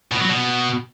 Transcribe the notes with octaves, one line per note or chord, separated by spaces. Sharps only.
B2
F#3
B2